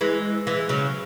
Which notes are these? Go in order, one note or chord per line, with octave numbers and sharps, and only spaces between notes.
E3 G#3
E3 G#3
C#3 F#3